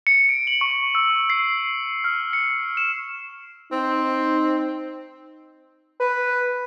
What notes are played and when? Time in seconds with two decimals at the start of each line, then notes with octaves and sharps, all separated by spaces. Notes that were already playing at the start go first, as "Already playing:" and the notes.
0.07 C#7
0.29 D7
0.47 F#7
0.61 C#6
0.95 E6
1.30 C7
2.04 F6
2.33 C#7
2.77 E7
3.72 C4 D#4
6.00 B4